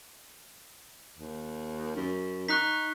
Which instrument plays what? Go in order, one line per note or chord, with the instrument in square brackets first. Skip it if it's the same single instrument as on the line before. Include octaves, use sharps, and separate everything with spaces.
[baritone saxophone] D#2
F#2
[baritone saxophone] D#4 [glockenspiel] C#6 F#6 B6